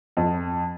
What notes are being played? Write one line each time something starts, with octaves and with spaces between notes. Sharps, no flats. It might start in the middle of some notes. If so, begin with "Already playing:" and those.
F2